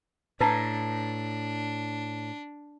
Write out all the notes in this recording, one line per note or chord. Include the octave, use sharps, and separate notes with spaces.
A2 D4 B4 A5 A#5